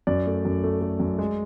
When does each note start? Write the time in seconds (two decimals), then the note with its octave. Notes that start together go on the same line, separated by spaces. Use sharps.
0.07 F#2 D5
0.27 A3
0.45 F#2
0.64 A3
0.81 A3
1.00 F#2
1.19 G#3